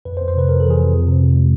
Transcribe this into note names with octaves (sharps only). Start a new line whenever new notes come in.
F2 B4
C5
F2
C5
C3 B4
F2 A#4
E3 A4
G#4
F2
F2
C3
C3
G#3